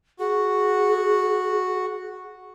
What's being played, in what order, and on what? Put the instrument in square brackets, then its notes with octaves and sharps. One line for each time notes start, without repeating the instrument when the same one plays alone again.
[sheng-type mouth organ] F#4 [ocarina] G#4